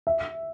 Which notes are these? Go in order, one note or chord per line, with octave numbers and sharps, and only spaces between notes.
E5